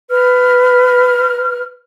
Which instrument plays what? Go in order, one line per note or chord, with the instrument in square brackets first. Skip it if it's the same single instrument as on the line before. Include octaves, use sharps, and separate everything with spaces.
[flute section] B4 F6